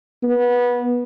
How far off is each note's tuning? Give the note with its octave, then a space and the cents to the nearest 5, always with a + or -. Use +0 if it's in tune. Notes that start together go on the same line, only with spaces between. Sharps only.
B3 -20